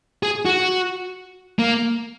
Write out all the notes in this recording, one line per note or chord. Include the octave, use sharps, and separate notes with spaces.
G#4
F#4
A#3